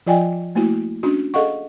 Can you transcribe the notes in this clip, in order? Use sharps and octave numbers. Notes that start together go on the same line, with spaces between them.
F3 F4 D5 D#5 G5 G#5
A3 A#3 E4 F#4
C#4 D4 F#4
G#4 A4 D#5 F5 F#5 C#6